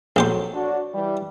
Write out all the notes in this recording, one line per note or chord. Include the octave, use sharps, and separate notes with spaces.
A#1 F2 F#3 G4 A4 C6
D4 F#4 C#5
E3 G3